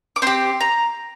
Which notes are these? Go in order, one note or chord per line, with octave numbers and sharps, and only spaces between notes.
D6
C4 G4 C6
A#5